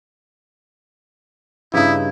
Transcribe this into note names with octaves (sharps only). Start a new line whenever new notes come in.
G2 C#3 D#4 E4